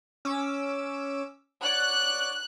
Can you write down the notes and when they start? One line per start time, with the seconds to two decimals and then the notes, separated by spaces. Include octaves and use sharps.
0.25 C#4 D6 E6
1.63 C#5 D5 F#5 F#6